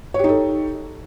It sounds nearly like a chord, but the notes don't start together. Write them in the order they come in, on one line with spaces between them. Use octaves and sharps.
C#5 G4 D#4 A4